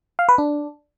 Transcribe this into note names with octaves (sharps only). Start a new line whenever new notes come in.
F5
B4
D4